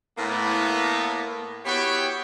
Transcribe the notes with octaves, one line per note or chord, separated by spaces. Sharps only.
A2 A#3 B3
B3 E4 F#4 G4 C#5 G5